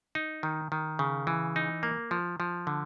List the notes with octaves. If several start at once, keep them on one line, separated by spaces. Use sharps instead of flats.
D#4
D#3
D#3
C#3
E3
D#4
A#3
F3
F3
D3